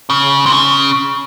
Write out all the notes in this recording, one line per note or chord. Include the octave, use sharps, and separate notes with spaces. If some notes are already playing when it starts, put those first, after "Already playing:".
C#3
C3
C#3